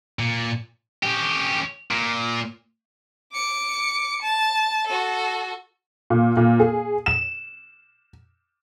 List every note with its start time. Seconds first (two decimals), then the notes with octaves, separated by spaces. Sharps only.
0.19 A#2
1.03 C#4 G4
1.91 A#2
3.34 D6 C#7
4.22 A5
4.87 F#4 A4
6.10 A#2
6.37 A#2
6.60 G#4
7.06 E7